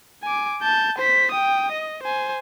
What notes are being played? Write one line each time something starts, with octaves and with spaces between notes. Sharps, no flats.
G#5 D6
A5 G6
C5 B6
G5 D#6
D#5
C5 G#5